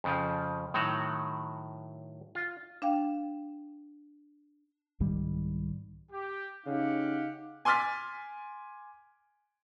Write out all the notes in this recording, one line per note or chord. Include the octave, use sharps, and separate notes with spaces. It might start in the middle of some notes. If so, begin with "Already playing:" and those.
F2 C#3 F3
A2 D#3 F#3 F#4 F#5
F4
D4 F5 G5
C2 G#2 D#3 G3
G4
C#3 D#4 G4 F5 F#5
G#5 C6 D6 F6 A6 B6